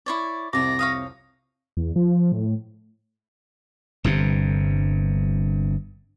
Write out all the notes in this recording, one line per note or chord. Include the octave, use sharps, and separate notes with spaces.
E4 C#5 D5
C2 F2 C3 D5 D6 A#6
C#5 F5 D#6
E2
F3
A2
G1 G2 C3